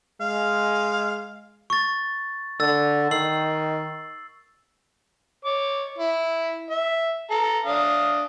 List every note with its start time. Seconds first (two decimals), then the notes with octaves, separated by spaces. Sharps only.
0.21 G#3 F5
1.70 C#6 A6
2.60 D3 E6 A6
3.11 D#3 E6 C7 F#7
5.45 C#5 D6
5.98 E4
6.70 E5
7.30 A4 A#5
7.65 D4 F5 D#6